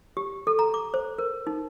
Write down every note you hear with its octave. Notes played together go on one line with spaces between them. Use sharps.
G4
A4
A#5
D6
C5
A#4
D#4